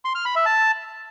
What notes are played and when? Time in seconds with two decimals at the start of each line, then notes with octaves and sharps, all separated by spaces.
0.05 C6
0.15 F6
0.25 B5
0.36 E5
0.46 A5